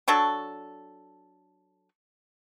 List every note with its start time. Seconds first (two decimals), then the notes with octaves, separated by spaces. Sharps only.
0.08 F#3 D4 A4 C#6